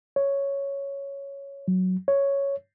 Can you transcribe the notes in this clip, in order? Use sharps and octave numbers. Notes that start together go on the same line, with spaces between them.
C#5
F#3
C#5